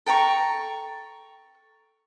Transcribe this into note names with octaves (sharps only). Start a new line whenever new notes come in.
A4 G5 A#5 C#6